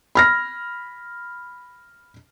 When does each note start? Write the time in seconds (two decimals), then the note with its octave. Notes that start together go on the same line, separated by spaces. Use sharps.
0.15 B5 F6 A#6